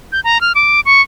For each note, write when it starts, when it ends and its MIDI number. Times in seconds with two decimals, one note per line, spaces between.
0.12 0.20 91
0.24 0.41 82
0.41 0.53 89
0.55 0.81 86
0.85 1.01 85